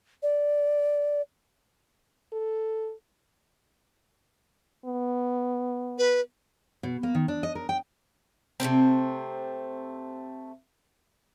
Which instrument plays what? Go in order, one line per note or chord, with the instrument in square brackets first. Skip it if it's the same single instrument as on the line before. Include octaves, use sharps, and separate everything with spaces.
[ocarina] D5
[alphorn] A4
[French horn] B3
[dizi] B4
[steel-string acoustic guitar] B2
A#3
D#3
D4
D#5
A#4
G5
[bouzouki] C3 D#3 A3 C4